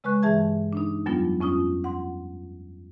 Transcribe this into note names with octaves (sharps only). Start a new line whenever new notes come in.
C#3 G#3 B4 C#6 F#6
G2 E3 G#4 E5 A5 G#6
D4 D#4
F2 F#3 G3 B3 D4 F4
F2 C#4 F4 D#6
F#5 C6